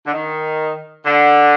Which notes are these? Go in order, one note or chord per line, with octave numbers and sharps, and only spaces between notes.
D3
D#3
D3